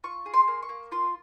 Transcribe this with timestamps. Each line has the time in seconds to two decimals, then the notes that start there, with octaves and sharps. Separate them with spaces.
0.04 F4 C#6
0.26 G#4
0.34 C6
0.48 A#3
0.63 C#6
0.69 A#3
0.92 F4 C6